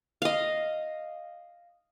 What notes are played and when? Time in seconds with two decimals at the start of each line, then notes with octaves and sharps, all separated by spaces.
0.22 D#5 F5